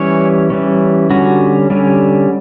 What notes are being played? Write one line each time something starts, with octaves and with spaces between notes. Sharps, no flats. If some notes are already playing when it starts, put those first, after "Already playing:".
Already playing: E3 G3 C#4 C#5
E3 G3 C#4
D3 G3 C#4 F#4
D3 G3 C#4